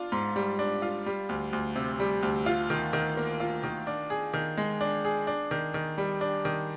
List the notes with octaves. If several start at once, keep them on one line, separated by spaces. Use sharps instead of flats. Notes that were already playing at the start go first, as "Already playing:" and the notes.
Already playing: D4 F4
G#2
G3
D4
F4
G3
D2
D2
C3
G3
D2
F4
D#3
D#3
A#3
F4
D#3
D4
G#4
D#3
G#3
D4
G#4
D4
D#3
D#3
G3
D4
D#3